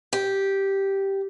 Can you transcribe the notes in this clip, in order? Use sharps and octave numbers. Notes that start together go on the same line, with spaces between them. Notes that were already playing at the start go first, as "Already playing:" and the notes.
G4